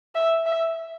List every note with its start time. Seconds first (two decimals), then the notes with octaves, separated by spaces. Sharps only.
0.15 E5
0.46 E5